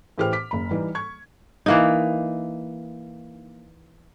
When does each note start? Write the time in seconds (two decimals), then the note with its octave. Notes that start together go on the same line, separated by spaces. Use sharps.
0.18 A2 E3 G4 C5 F6
0.33 D6 B6
0.51 F#1 B5
0.71 E3 G3 D#4
0.95 C#6 G#6
1.66 E3 A#3 D#4